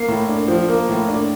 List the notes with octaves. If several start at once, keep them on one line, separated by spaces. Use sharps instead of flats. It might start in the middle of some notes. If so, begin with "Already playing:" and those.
Already playing: A#3 C7
A2
D4
F3
A#3
A2
D4